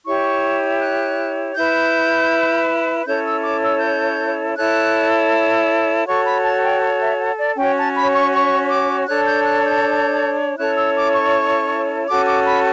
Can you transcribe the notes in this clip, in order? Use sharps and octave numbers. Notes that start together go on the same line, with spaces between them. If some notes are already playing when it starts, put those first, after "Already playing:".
E4 G4 C#5 C#6
F#6
E4 B4 G6
C#4 E4 A4 C#5 G6
E6
D6
E6
G6
E4 A4 C#5 F#6
F#4 A4 C#5 C#6
B5
A5
G5
E5
F#5
D5
C#4 F#4 C#5 G5
A5
B5
C#6
C#6
D6
D4 A4 C#5 F#6
G6
F#6
G6
C#4 E4 A4 C#5 F#6
E6
D6
C#6
C#4 F#4 A4 D6
D6
B5